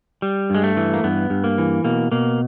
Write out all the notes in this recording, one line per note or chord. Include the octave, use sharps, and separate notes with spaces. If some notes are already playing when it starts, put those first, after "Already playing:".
G3
G2 G#3
A3
E3
A#3
G2 B3
G2
A#3
E3
B2 A#3
B2 A#3